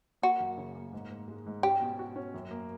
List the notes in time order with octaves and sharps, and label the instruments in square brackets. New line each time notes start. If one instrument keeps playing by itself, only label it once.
[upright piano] A#3 [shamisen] F#4
[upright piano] F#2
C#3
A#3
G#2
G#2
G#3
G#2
[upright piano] C#4 [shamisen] G4
[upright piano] B2
F#4
C#4
F#2
A#3